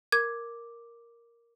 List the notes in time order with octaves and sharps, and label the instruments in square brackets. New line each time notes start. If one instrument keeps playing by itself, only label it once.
[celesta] A#4 D6 [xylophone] G#6